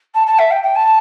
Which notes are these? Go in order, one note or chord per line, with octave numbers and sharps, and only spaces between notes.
A5
A5
E5
G5
G5
A5